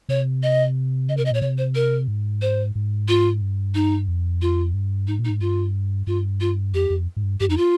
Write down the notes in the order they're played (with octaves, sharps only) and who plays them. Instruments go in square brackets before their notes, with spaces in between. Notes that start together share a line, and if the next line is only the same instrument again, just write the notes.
[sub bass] C3 [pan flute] C#5
[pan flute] D#5
[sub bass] C#3 [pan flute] D#5
[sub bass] C3 [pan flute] A#4
[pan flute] D#5
[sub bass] A#2 [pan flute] C#5
[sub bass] C3 [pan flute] C#5
[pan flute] C5
A#4
[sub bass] G#2
[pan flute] C5
[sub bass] G#2
[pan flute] F4
[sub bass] G2
[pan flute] D#4
[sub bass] F2
[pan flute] F4
[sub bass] G2
[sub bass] G#2 [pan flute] D#4
[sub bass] A#2
[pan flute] D#4
[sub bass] G#2
[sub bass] G2 [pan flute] F4
[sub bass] G2 [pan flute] F4
[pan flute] F4
[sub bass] F2 [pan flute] G4
[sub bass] F2
G#2
G2
[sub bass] G2 [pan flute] G4
[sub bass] F2 [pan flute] D#4
[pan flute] F4